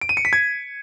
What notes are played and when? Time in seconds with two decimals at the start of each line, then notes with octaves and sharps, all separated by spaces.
0.01 D7
0.09 D#7
0.17 C#7
0.25 B6
0.33 G#6